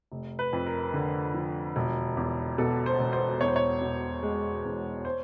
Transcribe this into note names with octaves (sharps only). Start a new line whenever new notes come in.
F1
B4
F2
A#4
D3
F3
E1
E2
B2 A4
C5
E1
C5
E2 C#5
C5
C#5
B2
G#3
E2
C5